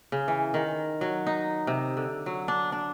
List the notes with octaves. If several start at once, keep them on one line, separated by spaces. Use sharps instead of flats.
C#3
E3
D#3
F#3
D#4
C3
D3
F#3
D4
D4